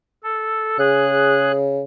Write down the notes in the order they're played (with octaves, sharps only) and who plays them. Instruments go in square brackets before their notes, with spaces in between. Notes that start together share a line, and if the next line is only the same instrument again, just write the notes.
[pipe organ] A4
[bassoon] C#3 [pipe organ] G#4 F#6